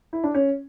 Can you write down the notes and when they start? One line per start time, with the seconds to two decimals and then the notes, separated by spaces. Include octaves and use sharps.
0.13 E4
0.24 D4
0.34 C#4